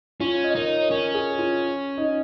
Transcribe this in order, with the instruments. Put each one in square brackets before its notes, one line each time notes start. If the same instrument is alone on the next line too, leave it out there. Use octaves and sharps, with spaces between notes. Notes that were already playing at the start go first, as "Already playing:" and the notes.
[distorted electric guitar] C#4 [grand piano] F4
[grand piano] D#5
[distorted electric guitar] D#4 [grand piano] A#4
[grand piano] C#5
[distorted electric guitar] C#4 [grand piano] A#4
[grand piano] G#4
F4
D#4